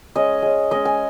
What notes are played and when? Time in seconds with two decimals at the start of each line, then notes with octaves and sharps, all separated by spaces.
0.15 G#3 C#4 D#5
0.43 G#3 C#4
0.71 G#3 C#4 D#5
0.85 G#5